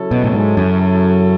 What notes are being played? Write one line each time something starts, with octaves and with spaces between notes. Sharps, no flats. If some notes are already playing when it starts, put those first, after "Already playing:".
Already playing: C#3 F#3 C#4 E4 A4
B2
A2
G#2
F#2